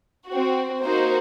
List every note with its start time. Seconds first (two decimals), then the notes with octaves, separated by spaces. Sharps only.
0.27 C4 F#4
0.82 A#3 D#4 F#4 C5